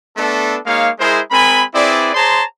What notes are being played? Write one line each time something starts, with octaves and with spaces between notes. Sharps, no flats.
A3 B3 D4 A4
G#3 A#3 D#4 C#5 F5
G#3 E4 G#4 A#4 C5
G#3 C4 A#4 G#5 B5
C4 E4 G#4 B4 D5
G#4 C5 C#5 A5 A#5 C6